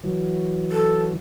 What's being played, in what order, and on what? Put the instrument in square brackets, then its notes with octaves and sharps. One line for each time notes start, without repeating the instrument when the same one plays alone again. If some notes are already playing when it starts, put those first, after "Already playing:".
[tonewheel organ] E3 F#3
[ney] A4